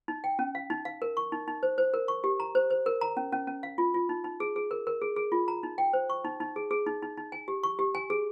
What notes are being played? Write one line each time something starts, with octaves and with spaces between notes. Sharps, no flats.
D#4
G5
C#4
F5
D#4
F5
A#4
C#6
D#4
D#4
C5
C5
A#4
C#6
G4
A#5
C5
C5
A#4
A#5
C#4
C#4
C#4
F5
F4
F4
D#4
D#4
G#4
G#4
A#4
A#4
G#4
G#4
F4
A#5
D#4
G5
C5
C#6
D#4
D#4
G#4
G#4
D#4
D#4
D#4
G#5
G4
C#6
G4
G#5
G#4